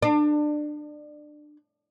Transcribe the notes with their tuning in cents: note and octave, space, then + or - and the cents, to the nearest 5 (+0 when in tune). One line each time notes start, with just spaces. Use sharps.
D4 +25